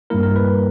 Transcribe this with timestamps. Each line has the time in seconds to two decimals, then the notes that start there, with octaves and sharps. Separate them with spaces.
0.10 G2 G3 A#3 E4 A#4
0.23 A#4
0.36 B4